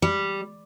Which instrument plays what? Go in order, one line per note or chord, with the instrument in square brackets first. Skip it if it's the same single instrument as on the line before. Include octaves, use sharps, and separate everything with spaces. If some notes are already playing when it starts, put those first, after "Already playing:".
[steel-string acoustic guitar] G3